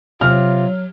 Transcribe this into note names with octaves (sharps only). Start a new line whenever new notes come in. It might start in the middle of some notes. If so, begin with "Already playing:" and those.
C3 F#3 F4 F6